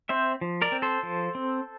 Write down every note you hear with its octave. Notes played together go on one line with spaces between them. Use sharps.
C4 C5 E5
F3
A#4 D5
C4
A4 C5
F3
C4